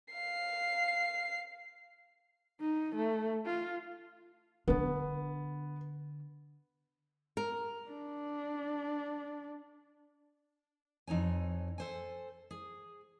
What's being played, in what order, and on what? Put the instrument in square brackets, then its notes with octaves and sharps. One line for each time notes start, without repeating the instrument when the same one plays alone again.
[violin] F5 C7
[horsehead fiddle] D#4
A3
F4
[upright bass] D3 D4 [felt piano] B3
[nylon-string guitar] A#4
[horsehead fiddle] D4
[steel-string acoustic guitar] F2 D#4 C#5 G#5
A4 C5 G#5
G#4